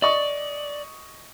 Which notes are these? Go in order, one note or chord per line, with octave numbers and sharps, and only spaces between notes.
D5 D#5 C#6